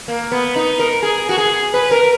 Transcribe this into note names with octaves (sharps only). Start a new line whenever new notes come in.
A#3
B3
D#4
A#4
G#4
F#4
G#4
B4
A#4